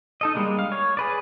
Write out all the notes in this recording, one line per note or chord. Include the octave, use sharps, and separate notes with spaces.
D#4 A4 D#5
G3 G#3 A#3 D4
F5
C#5
G#4 B4 D5